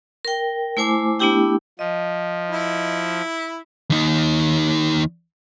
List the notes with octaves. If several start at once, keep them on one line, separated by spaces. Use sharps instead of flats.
A#4 G5
A3 E4 C5 G#5 D6
A3 B3 D4 E4 G4 G5
F3 D#5
E4
D#2 D#4